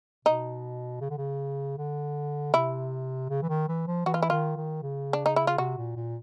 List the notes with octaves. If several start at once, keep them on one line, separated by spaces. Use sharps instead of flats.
B2 D#4
C#3
D3
C#3
D3
C3 E4
C#3
E3
D#3
E3
F3
E3 F#4
F4
E4
D#3 F4
D#3
C#3
D4
D#4
E4
F4
C3 F#4
A#2
A#2